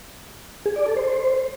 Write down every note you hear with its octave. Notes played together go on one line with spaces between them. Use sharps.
G#4
D5
A4
C5